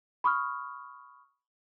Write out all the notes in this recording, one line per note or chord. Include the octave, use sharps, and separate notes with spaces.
B5 C#6 D#6 F6